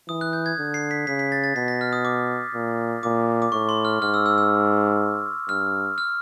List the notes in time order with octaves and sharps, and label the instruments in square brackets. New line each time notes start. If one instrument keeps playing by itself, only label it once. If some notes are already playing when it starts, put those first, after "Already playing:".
[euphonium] E3 [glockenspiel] D#6
[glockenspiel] F#6
G6
G#6
[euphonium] D3
[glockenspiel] C7
B6
[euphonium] C#3 [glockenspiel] B6
[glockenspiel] B6
A6
A6
[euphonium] B2 [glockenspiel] B6
[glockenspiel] A#6
F6
D#6
D6
[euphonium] A#2
[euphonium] A#2 [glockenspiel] D6
[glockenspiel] D6
[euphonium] A2 [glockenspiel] C#6
[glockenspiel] C6
F6
[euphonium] G#2 [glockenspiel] F6
[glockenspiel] E6
E6
E6
[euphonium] G2 [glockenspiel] F6
[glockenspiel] F6